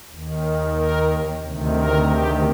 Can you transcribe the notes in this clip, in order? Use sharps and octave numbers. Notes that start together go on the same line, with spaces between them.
D#2 D#3
A#4
D2 C3 D#3
A#4
G4